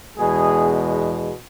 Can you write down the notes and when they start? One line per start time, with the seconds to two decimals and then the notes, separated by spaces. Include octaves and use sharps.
0.18 E2 B2 G#3 G#4